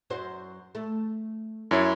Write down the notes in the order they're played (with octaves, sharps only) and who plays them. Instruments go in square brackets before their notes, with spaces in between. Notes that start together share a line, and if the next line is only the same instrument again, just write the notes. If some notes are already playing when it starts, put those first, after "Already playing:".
[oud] F#2 F#4 C5
A3
[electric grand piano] F#2 E4 C#5